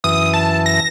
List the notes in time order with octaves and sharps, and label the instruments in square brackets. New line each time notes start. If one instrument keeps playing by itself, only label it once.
[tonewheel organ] F#2 E3 [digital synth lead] D#6
[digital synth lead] A5
A#6